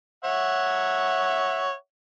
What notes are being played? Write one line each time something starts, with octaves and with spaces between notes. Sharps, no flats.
C#5 E5 F#5